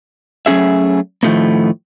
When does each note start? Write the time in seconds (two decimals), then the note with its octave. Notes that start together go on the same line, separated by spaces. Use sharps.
0.46 F#3 A3 C#4 G#4 E5
1.23 A2 D#3 F3 A3 A#3